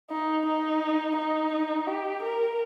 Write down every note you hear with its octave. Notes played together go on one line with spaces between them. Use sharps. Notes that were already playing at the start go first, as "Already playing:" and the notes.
D#4
D#4
D#4
G4
A#4